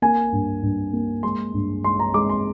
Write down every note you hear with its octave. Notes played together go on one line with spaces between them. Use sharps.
A#3 G#5
G2
G2
A#3
G#3 C6
G2
G#3 C6
A#5
G#3 D6
C6